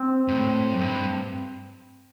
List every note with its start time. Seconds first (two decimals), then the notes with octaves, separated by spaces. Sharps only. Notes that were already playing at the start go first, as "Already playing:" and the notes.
Already playing: C4
0.28 G#2
0.35 A2
0.73 F#2
0.81 G2